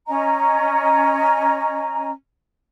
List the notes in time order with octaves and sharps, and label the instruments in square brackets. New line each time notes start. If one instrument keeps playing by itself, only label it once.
[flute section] C#4 D#5 A#5